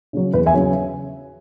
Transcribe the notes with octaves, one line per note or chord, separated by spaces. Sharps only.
C#3 F#3
E2 B4
E5 G#5
C#3 F#3